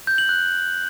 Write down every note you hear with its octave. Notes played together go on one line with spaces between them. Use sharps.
G6
F#7
F#6